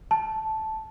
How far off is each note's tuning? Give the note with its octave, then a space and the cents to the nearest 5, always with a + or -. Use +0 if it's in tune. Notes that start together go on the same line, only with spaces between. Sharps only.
A5 -5